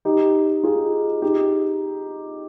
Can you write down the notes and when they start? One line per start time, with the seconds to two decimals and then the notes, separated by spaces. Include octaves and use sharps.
0.05 D#4 G4
0.63 F4 G#4
1.22 D#4 G4